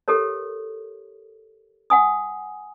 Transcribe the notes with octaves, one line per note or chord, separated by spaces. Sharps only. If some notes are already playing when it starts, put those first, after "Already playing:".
G4 A4 A#4 C#5
F#5 G#5 D#6